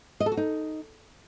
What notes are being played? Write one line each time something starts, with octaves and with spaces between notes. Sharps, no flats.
D#5
A4
F#4
D#4